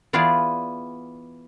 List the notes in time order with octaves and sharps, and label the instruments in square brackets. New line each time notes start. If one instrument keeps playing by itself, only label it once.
[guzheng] E3 B3 F4 G#4 B4 D5